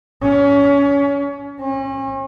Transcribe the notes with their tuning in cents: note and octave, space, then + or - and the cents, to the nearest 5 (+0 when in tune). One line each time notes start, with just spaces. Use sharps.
C#4 +25
C#4 -40